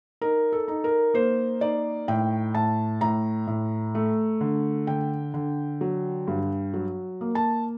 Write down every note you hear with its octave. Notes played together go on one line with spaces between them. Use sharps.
D#4 A#4
A4
D#4
A#4
A#3 C5
D#4 D5
A2 G5
A2 A5
A2 A#5
A2
A3
D3
D3 G5
D3
F#3
G2
F#3
A#3
A5